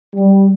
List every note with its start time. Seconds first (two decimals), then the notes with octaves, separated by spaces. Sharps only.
0.16 G3